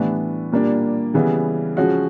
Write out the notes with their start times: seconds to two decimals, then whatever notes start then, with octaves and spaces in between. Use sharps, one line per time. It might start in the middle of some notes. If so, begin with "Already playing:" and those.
Already playing: A2 E3 G3 B3 D4
0.52 A#2 G3 A#3 D4
1.14 C#3 E3 G3 B3
1.77 C#3 F3 G#3 C#4 F#4